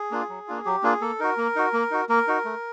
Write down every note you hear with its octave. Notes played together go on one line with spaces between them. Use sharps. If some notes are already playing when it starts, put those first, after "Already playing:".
Already playing: G#4
A#3 D4 F4
F#3
A#3 D4 F4
F#3 G4
A#3 D4 F4 G#4
A#3 A4
D#4 F#4 A#4
A#3
D#4 F#4
A#3
D#4 F#4
A#3 A#4
D#4 F#4
A3